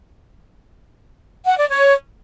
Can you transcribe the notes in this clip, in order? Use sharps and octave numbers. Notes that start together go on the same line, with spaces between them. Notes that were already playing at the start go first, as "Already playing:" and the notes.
F#5
D5
C#5